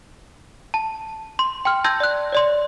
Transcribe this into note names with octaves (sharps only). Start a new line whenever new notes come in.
A5
C6
G5 C6 F6
A5 C6 E6 G6 G#6 A#6
D5 F#6
C#5 D5 C6